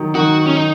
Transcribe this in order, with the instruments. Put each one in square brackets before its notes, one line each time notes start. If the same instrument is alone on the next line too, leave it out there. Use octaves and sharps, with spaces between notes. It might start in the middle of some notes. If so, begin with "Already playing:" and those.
Already playing: [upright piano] D#3 F#3
[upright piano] D#3 [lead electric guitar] F#4
[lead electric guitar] C#4
D#4